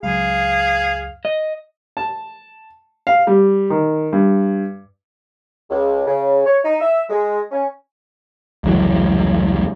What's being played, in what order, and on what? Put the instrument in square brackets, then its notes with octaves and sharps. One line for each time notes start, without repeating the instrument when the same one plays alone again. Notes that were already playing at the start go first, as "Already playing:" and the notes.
[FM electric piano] C#2 F#2 [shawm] G#4 [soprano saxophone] F5
[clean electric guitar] D#5
[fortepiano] A5
F5
G3
D#3
G2
[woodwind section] C#2
C#3
C#5
D#4
E5
G#3
C#4
[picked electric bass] F1 C#2 E3 F#3